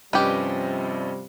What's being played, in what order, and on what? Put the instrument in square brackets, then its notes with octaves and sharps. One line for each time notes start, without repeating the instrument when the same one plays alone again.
[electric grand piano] G2 C#4 D#5 [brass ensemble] C3 F3 G3 [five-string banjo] G4 B4